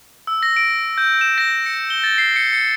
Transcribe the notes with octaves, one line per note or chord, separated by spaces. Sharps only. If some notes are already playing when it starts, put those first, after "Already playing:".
E6
A#6
D7
G6
E7
A#6
C#7
G7
A6
C7
C#7
C#7